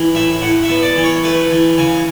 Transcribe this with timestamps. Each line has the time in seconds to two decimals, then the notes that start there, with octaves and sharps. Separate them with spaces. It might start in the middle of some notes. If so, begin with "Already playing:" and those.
Already playing: E3
0.15 A2 E5
0.42 A2 F#5
0.63 E5
0.69 B3
0.83 D5
0.96 E3
1.04 C#5
1.24 A3 B4
1.51 E3
1.78 C#3 G#5